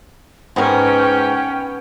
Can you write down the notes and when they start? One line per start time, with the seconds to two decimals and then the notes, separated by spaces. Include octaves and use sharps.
0.56 G#2 B3 C#4 A#4 B4 G5